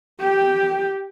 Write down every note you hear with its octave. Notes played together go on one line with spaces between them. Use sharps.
G4 G5